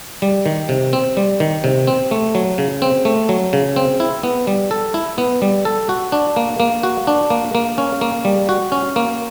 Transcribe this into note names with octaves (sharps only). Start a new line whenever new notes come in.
G3
D#3
C3
C4
G3
D#3
C3
C4
A3
F#3
C#3
C4
A3
F#3
C#3
C4
E4
B3
G3
A4
E4
B3
G3
A4
F#4
D4
A#3
A#3
F#4
D4
A#3
A#3
C#4
A#3
G3
F#4
C#4
A#3